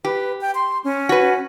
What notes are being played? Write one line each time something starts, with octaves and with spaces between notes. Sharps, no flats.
G4 B4
G5
C6
C#4
F#4 B4